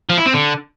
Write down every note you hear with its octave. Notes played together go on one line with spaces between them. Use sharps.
F3
E4
C4
D3